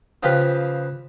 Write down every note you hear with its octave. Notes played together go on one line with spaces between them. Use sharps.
C#3 F3 F4 G4 B4